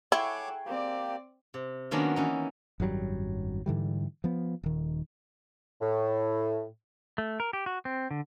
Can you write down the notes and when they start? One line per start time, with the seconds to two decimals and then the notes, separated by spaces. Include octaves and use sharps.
0.12 E4 G#4 A4 C#5 F#5 G5 C#6 D6
0.66 A#3 C4 G4 D5
1.54 C3
1.91 D#3 F#3 A#3 B3 C#4 D4
2.16 E3 C#4 D#4
2.80 G#1 F#2 F#3 G3
3.66 G#2 D3 E3 G3
4.24 F3 B3
4.63 D#1 D#3
5.81 A2
7.18 A3
7.40 A#4
7.53 G4
7.66 F#4
7.85 C4
8.11 D3